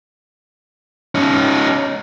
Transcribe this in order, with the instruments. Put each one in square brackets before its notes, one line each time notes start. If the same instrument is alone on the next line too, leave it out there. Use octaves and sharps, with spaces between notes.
[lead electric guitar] C#4 D#4